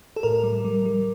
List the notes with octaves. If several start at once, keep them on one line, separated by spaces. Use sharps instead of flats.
A4
A2 A#4
G3
G3
G3